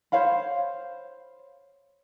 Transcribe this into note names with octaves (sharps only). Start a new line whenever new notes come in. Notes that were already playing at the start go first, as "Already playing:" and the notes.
C5 C#5 F5 B5